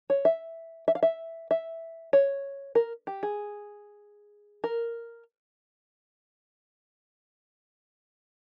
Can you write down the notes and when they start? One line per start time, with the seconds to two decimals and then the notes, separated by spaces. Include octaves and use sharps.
0.10 C#5
0.25 E5
0.88 E5
0.95 F5
1.03 E5
1.51 E5
2.13 C#5
2.75 A#4
3.07 G4
3.23 G#4
4.64 A#4